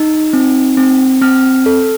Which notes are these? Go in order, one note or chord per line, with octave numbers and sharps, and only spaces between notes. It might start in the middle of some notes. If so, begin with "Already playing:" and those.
Already playing: D#4
C4
C4
C4 F6
A4